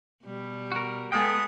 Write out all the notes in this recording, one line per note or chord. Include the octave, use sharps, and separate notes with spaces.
B2 G3
F#4 A#4
G#3 A3 B3 G#4 A4 G5 D#6